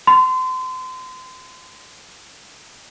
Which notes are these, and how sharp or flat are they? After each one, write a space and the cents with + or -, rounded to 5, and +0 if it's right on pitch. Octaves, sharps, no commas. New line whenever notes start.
C6 -30